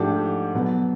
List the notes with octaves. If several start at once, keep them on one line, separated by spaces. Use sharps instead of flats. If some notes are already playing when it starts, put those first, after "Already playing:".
Already playing: G#2 F3 A3 D4 G4
B2 F#3 B3